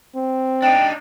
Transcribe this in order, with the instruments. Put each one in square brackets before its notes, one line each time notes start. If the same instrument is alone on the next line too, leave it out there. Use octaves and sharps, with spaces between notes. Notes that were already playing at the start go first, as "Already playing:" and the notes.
[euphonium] C4
[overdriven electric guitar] D4 D#4 [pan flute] G5